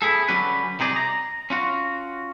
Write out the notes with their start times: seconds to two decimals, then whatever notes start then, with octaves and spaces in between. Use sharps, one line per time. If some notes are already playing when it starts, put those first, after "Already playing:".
0.02 B3 E4 G#4 A4
0.29 D3 F#3 G3 C#4 B4
0.79 C2 C3 D#4 G#4 D5
0.96 A#5
1.50 C#4 F4 F#4